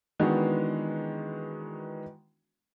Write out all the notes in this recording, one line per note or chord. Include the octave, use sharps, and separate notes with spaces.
D#3 E3 G#3 B3 D4 F#4